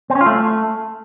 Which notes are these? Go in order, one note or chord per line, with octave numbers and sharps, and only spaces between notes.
C4
C#4
F4
A3